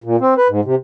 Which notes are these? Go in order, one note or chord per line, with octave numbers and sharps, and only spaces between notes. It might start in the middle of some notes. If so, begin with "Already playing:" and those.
A#2
C4
B4
G#2
C3